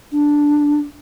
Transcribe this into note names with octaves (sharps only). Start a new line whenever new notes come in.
D4